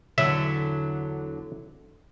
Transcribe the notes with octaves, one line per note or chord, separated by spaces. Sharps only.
E2 D3 F#3 E5